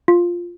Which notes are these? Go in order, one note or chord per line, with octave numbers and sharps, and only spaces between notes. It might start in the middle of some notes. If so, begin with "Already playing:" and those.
F4